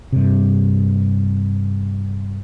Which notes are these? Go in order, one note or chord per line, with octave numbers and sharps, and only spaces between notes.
G2 C3